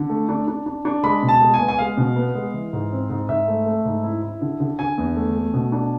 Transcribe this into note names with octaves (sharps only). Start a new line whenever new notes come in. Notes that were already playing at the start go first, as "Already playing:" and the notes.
Already playing: D3
A3
D4
D4
D4
D4
G#3 B5
B2
A5
G#3
G#5
B3
G#5
G#3 F5
B2
B3
G#3
E3
G#2
C4
G#2
G#2 E5
A3
A3
G#2
E4
E4
D3
D3
D3 G#5
E2
A3
A3
B2
D4